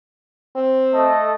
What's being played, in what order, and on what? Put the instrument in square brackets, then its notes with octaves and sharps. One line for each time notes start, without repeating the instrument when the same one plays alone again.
[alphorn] C4
[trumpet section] A3 A4 D#5